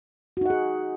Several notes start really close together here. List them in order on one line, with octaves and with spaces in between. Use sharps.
F#4 D#4 F#5 G#4